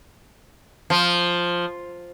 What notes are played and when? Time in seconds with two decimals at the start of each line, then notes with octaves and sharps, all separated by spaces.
0.90 F3